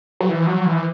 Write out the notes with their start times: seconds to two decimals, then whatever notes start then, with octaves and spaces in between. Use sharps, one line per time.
0.20 F#3
0.29 E3
0.47 F#3
0.66 E3